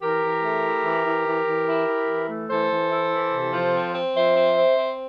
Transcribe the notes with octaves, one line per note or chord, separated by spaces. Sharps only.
E3 G4 A#4
E3
A3
E4
E3
E3
E3
E3
E4
E4
E3
A3
E3 A4 C5
E3
E4
E3
C3
F3
C4
C4
F3 C5 E5
C4
C4
C4